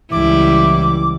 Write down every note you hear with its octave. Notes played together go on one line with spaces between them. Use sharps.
C#2 E3 G3 E4 D6